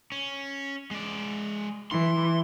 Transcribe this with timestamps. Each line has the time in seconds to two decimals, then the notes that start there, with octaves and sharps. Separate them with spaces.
0.12 C#4
0.91 G#3 D5
1.91 E3 C6